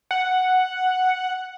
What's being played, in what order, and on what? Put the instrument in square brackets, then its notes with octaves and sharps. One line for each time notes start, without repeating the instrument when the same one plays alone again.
[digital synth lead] F#5